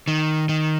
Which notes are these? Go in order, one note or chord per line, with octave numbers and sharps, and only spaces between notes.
D#3
D#3